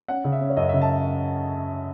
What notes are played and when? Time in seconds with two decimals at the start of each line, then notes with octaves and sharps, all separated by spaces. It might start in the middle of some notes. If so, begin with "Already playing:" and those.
0.08 C#4 F#5
0.24 C#3
0.32 E5
0.41 C#4
0.50 C#5
0.57 F#2 D#5
0.69 E5
0.74 C#3
0.81 A5